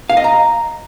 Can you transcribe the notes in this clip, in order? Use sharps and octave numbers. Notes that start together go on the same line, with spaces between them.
F5
D#5
A#5